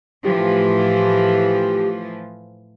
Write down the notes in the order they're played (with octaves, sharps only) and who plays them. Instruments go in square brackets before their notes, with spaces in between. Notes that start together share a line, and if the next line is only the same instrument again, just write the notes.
[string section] A2 E3 F3 [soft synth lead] G4